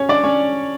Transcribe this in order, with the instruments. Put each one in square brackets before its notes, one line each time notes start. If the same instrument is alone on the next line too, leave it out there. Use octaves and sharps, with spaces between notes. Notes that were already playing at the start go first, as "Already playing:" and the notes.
Already playing: [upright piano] C#4 C#5
D4 D5
C#4 C#5